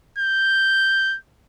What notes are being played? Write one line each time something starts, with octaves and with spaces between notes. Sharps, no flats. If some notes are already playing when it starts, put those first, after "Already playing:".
G6